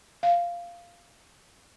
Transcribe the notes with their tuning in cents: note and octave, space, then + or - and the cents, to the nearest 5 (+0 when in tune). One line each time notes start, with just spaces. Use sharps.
F5 -10